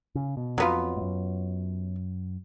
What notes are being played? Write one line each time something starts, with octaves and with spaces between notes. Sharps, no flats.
C#3
B2
F2 F#3 B3 F4
G#2
F#2